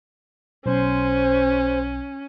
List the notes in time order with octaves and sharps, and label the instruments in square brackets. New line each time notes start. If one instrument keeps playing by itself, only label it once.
[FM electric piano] B1 [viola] C#4 [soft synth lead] C5